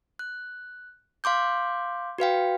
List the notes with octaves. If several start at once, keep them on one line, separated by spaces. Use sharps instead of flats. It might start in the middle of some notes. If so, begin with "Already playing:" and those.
F#6
F5 C6 D6 G6
F#4 B4 F5 G5